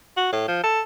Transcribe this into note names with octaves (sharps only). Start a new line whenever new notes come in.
F#4
A2
F3
A4